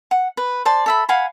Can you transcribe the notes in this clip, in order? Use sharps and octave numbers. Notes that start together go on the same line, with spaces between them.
F#5
B4
C5 D5 A5
A4 E5 B5
F5 F#5 G#5 B5